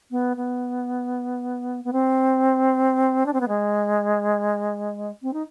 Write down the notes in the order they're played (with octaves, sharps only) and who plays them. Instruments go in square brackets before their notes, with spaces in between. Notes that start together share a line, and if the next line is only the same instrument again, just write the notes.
[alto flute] B3
B3
B3
C4
D4
C4
B3
G#3
C4
D#4